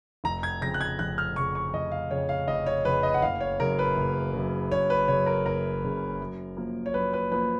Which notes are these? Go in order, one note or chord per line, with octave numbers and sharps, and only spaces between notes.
F1 A#5
G#6
F2 C#3 A#6
F#6
G#6
F1 F#6
F6
F2 C#3 C#6
C#6
F1 D#5
F5
F2 C#3 C#5
F5
F1 D#5
C#5
F2 C#3 B4
D#5
F#5
F#1 F5
C#5
F#2 C#3 A#4
B4
F#1
F#2 C#3
F#1 C#5
B4
F#2 C#3 C#5
A#4
F#1 A#4
F#2 C#3
F#2
F3 A#3
C#5
F#2 B4
B4
F3 A#3 B4